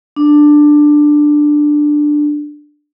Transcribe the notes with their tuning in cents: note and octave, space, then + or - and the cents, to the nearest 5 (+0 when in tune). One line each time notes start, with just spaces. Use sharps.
D4 +10